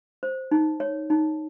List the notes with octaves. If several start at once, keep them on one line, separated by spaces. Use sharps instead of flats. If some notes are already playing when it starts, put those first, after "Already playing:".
C5
D#4
C#5
D#4